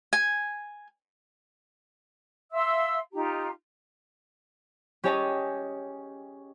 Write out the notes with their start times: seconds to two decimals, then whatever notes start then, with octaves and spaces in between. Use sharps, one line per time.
0.13 G#5
2.52 E5 F5 C6 E6
3.13 D#4 F4 G4 A#5
5.04 C#4 G4 G#4 C#5 D#5 A5